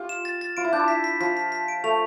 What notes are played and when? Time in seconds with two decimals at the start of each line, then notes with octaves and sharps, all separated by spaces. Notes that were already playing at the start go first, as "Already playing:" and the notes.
Already playing: F4 G4
0.09 E7
0.25 A6
0.41 A6
0.57 F4 D7
0.64 E4
0.72 D4 G6
0.79 E4
0.88 B6
1.04 B6
1.20 F3 B6
1.37 B6
1.52 B6
1.68 D7
1.84 A3 F7